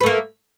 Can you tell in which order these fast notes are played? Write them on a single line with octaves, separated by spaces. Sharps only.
B4 A3 A#3